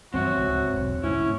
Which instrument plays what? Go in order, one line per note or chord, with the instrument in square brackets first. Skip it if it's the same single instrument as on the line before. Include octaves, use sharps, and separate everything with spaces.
[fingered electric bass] G2 E3 G3 [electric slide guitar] C4 C#5 E5 [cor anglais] F#4
[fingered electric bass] D1 C#2 G#2
E1 B1
[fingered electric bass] G#2 D3 A3 [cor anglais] C#4 [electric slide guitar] E4